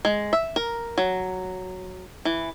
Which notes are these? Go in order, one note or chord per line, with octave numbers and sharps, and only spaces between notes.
G#3
E5
A#4
F#3
E3